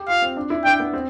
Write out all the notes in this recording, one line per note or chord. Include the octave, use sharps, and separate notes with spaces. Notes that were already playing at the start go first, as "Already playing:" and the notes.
Already playing: G4
F4 F5
C4
D4
E4
D4 G5
B3
C4